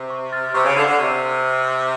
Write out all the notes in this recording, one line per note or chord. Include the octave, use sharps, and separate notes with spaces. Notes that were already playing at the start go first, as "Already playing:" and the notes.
Already playing: C3
C#6
F6 A6
C3 C#6
C#3
D3 E6 G#6 C7 D#7
D3
C3 C#6